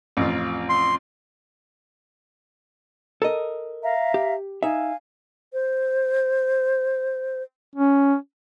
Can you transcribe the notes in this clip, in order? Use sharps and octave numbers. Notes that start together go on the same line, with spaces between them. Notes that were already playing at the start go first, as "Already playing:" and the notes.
A1 F2 F4
C6
A4 A#4 D#5
E5 F5 A#5
G4
D#4 E5 F5 G#5
C5
C#4